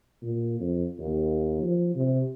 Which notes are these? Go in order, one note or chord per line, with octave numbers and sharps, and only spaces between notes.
A#2
F2
D#2
F3
C3